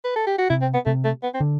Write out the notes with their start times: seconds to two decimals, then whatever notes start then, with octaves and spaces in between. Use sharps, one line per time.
0.04 B4
0.16 A4
0.27 G4
0.38 F#4
0.50 C3 E4
0.62 C4
0.74 B3
0.86 C3 A3
1.04 A3
1.23 B3
1.34 C4
1.40 D3